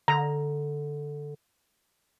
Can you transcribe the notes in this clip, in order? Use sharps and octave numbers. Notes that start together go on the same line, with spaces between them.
D3 A#5